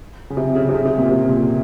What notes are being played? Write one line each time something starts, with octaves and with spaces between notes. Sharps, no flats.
C#3
C3
C#3
C3
C#3
C3
A#2
C3
A#2